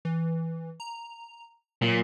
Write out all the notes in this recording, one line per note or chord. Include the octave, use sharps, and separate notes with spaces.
E3
A#5
A#2 F#3